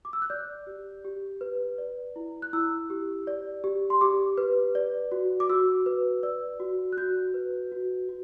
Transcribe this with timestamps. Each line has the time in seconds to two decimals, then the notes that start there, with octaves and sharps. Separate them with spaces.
0.05 D6
0.13 E6
0.22 F#6
0.30 D5 G6
0.67 G4
1.05 G4
1.41 B4
1.78 D5
2.16 E4
2.42 F#6
2.53 E4 E6
2.90 G4
3.27 D5
3.64 G4
3.90 C6
4.01 G4 D6
4.38 B4
4.75 D5
5.12 F#4
5.40 D6
5.50 F#4 E6
5.86 B4
6.23 D5 E6
6.60 F#4
6.93 F#6
6.97 F#4 G6
7.34 B4
7.72 F#4
8.09 F#4